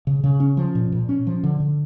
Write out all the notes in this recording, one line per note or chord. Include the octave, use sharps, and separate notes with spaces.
C#3
C#3
C#4
F3
A#2
A#2
C#4
F3
D3
D3